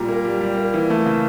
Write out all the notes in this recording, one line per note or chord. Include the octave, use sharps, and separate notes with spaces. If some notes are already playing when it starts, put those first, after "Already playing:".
Already playing: A#2 G3 A#5
A#3
G3
G3
A#3
E3
A3
C#3